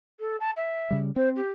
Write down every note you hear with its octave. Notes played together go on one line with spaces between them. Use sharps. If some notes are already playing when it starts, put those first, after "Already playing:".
A4
A5
E5
C#3 G3
C4 C5
G4